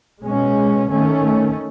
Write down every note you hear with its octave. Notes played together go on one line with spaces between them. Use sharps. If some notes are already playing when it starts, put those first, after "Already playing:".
B2 G#3 C#4
D#3 A3 C#4